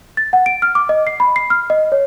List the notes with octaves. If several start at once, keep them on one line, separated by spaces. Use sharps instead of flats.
A6
F#5
D7
F6
D6
D#5
C7
B5
C7
F6
D#5
C#5